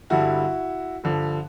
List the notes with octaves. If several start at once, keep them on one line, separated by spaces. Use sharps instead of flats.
G2 D3 G3 E4 F#4
G2 D3 F3